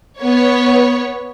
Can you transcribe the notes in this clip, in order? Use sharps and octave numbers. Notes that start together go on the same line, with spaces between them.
B3 C#5